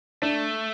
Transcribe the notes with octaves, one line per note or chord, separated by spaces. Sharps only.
A3 D4